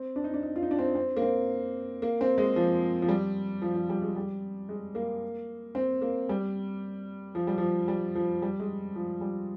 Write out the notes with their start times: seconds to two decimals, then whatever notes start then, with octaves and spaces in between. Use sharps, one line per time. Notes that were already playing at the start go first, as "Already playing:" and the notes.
Already playing: C4
0.16 D4
0.24 D#4
0.34 D4
0.43 D#4
0.56 F4
0.63 D#4
0.71 D4
0.79 C4
0.95 C4
1.16 A#3
1.22 C4
2.02 A#3
2.21 C4
2.38 G#3
2.56 F3
3.02 F3
3.09 G3
3.62 F3
3.75 F3
3.90 G3
4.02 G#3
4.16 G3
4.69 G#3
4.95 A#3
5.75 C4
6.02 A#3
6.29 G3
7.35 F3
7.47 G3
7.58 F3
7.88 G3
8.15 F3
8.42 G3
8.60 G#3
8.96 F3
9.21 G3